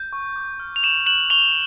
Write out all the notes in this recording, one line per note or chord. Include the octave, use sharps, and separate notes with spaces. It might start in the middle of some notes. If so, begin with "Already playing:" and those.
Already playing: G6
C#6
D6
F6
F7
D6 E7 F#7
F#6 E7 F#7
C#6 F7 G7